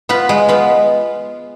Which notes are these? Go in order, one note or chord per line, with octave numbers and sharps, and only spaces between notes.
B3 F4 B4
G#3
B3 F4